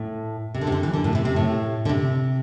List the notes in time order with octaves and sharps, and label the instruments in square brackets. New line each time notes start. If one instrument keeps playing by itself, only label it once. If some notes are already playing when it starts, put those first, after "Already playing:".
Already playing: [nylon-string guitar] A2
C3
D3
C3
D3
E3
D3
A2
C3
C3
A2
D3
C3